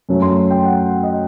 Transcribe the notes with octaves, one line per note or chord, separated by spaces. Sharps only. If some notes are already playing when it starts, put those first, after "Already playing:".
F#2 F#3 A3
C6
G5
F#5
D#5